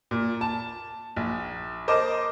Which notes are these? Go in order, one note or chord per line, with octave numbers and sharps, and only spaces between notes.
A#2
A5
A#1
A#4 C5 D#5 A5 D6